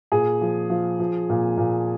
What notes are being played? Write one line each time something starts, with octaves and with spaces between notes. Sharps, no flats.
A#2 G#4
F3
F3
F3
A#2
A#2